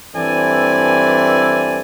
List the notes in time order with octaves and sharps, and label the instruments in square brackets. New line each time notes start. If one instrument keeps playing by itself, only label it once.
[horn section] G2 E3 C4 A4 D5 G#5